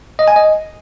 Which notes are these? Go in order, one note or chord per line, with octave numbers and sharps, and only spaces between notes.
D#5
G#5
D#5